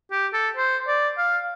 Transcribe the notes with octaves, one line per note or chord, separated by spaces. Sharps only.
G4
A4
C5
D5
F5